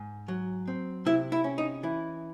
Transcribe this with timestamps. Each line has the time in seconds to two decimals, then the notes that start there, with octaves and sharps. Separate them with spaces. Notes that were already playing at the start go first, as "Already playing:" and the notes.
Already playing: G#2
0.28 F#3
0.68 C4
1.06 C3 E4
1.32 E4
1.44 C#4
1.58 D#4
1.83 E3 E4